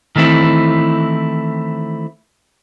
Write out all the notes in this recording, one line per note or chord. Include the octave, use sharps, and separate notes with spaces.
D#3 E3 A3 C4 E4